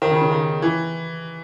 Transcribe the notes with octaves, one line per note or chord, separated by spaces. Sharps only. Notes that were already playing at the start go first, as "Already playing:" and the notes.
D#3
C#3
C#3
D#3
E3